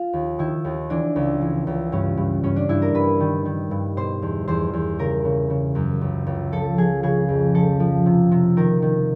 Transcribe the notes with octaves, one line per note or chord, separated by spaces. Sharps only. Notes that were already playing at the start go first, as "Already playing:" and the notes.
Already playing: F4
D#2
D#3 E4
D#2
E3 D4
C#2
E3
C#2
G2 C#4
G2
G2 C#4
D4
G2 E4
A#4
G2 B4
D#3
D#3
G2
B2 C5
E2
E2 C5
E2
C#3 A#4
C#3
C#3
F#2
C#2
C#2
F3 A4
F3 G#4
C#3 G#4
F2
F3 A4
F3
C3
C3
D#3 A#4
D#3